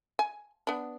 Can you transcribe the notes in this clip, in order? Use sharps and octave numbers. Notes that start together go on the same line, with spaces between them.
G#5
B3 D4